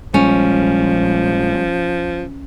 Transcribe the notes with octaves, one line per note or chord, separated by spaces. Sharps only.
A#1 F3 G3 G#3 C#4